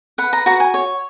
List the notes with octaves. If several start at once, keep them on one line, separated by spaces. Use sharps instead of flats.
B4 F#5
A#5
F#4 A#5
G#5
C#5